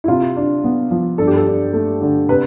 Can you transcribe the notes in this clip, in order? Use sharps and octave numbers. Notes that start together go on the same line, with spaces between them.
E4
C3 F4
D4
B3
F3
G2 A4
G4
A4
D4
A3
D3
C3 B4